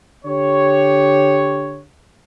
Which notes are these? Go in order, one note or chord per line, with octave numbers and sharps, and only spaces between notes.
D3 G4 C#5